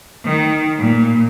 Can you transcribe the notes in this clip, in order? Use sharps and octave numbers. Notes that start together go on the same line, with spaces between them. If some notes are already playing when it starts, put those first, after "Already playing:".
D#3
A#2